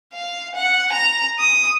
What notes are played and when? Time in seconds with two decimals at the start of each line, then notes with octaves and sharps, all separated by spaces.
0.13 F5
0.55 F#5
0.92 A#5
1.39 D#6